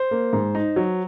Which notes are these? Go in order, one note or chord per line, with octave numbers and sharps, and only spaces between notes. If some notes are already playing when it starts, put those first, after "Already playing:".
Already playing: C5
A#3
G#2
D#4
F#3